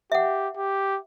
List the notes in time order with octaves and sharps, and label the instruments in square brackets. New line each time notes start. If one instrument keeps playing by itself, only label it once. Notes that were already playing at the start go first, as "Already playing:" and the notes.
[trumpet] G4 [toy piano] E5 F#5
[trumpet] G4